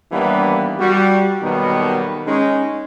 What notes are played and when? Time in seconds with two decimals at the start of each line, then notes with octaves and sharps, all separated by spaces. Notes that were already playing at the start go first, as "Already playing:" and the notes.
0.11 D#2 E3 G3 A#3 B3 D4
0.78 G3 F#4
1.42 B1 B2 D#3 G3 A#3 B3
2.26 G#3 C#4 D#4